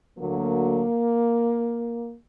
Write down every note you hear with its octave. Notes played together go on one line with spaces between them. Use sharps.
D2 D3 F#3 A#3